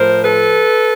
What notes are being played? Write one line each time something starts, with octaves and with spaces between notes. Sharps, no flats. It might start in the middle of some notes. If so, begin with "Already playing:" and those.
Already playing: A2 F3 A#4 C5
A4 B4